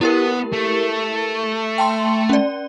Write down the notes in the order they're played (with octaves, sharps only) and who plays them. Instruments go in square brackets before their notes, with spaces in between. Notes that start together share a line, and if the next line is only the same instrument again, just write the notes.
[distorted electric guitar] B3 [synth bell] E4 G4 A#4
[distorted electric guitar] A3
[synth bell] G5 A5 C6
C#4 D5